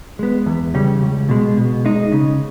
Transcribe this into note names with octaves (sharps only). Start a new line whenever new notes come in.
G#3 B3
E2
C#3 G3 C#4
C#2
B2 G#3
B2
G#3 D#4
C#3